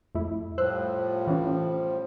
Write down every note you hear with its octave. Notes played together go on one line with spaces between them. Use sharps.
F2 A3 E4
A2 F3 G3 C5 E6 F#6
E3 C#4